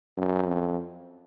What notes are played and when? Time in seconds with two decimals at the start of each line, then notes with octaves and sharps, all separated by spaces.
0.17 F#2
0.47 F2